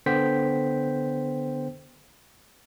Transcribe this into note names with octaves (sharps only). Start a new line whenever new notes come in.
D3 B3 C5 G5 B6